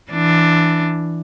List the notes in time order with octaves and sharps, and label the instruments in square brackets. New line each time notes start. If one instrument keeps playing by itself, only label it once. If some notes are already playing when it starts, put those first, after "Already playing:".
[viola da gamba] E3 D4